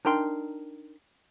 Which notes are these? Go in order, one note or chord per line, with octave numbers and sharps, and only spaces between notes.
D4 D#4 A#4 G5 C6